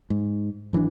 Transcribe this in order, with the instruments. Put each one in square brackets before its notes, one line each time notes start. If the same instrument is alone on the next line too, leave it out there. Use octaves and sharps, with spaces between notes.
[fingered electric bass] G#2
G#1 E3 F#3 D4